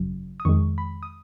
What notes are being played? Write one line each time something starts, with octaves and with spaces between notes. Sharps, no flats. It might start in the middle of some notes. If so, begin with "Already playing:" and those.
Already playing: G#1 F#2 C#3 F#3
D#6
F2 D#3 G#3 C#6
B5
D#6